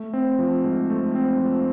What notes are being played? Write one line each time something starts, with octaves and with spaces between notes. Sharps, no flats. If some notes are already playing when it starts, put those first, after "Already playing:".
Already playing: A3
C4
F3
G#2
A3
C4
F3